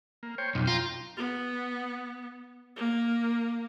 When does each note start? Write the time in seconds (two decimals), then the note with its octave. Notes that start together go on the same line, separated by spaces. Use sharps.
0.23 A#3
0.38 C5 C#5 G5
0.55 B1 F2
0.67 F4 G5 A#5
1.17 B3
2.76 A#3